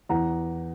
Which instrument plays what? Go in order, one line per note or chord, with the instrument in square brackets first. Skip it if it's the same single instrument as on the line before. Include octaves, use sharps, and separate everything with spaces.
[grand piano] E2 F#5 A#5